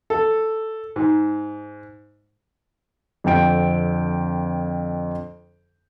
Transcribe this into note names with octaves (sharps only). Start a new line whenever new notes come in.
A4
G#2
F2 D3 C4 G5 D7